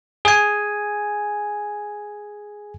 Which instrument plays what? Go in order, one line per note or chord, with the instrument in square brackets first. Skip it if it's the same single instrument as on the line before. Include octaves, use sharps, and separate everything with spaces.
[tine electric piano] G#4 G#5